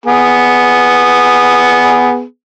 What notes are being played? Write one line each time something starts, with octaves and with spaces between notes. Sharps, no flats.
B3 G#4